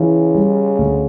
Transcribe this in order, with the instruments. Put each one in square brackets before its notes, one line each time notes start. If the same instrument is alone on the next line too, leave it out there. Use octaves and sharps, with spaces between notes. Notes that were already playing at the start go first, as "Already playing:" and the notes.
Already playing: [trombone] C#3 [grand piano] E3
[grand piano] G3
D2